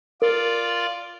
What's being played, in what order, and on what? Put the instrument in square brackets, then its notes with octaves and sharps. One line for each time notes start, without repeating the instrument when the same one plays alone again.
[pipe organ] F4 D5 [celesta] A#4